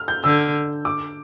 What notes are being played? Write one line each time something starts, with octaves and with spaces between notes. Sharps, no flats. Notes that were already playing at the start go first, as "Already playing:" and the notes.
Already playing: F6
G6
D3 E6
D6